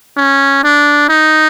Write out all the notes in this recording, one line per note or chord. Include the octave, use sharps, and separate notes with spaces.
C#4
D4
D#4